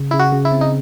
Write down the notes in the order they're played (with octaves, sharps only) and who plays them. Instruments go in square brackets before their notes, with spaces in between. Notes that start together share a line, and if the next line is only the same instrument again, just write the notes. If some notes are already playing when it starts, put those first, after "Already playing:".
Already playing: [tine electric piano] C#3
[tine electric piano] C#3 [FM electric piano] E4
[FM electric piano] F#4
[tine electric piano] C#3
[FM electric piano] E4
[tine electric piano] C4
[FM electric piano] D#4